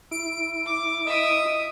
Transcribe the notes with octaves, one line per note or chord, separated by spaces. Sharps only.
E4 D7
D6
D#5 E5 D#6